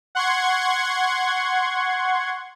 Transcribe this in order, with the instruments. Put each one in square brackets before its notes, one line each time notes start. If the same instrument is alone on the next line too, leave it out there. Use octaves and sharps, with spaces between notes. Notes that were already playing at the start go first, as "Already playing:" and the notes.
[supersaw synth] F#5 C6 C#6 G#6